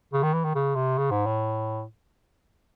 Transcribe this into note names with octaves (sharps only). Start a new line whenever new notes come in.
C#3
D#3
E3
D#3
C#3
C3
C#3
G#2
A2